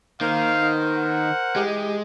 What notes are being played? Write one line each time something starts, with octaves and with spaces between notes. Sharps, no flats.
D#3 A#3 A#4 C5 F5
A#3 B3 D#4
F#5
E3 G#3 D#4 G4